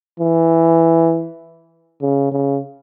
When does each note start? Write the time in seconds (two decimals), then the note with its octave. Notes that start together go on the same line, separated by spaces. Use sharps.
0.20 E3
2.02 C#3
2.32 C#3